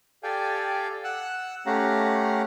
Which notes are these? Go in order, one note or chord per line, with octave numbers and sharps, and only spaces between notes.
G4 A4 D5 F5 G5 G#5
F#5 E6 F#6
A3 C#4 G4 F5 F#5 A#5